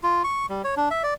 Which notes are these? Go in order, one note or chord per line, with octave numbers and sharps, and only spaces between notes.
F4
C#6
G3
C#5
D4
E5
D5